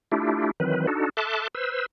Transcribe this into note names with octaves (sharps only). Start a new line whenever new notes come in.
A3 D4 E4 F4 G4
D#3 E3 F#3 C4 B4
D4 D#4 F#4 A4
A4 E5 A5 C6 D6 F#6
B4 C5 E6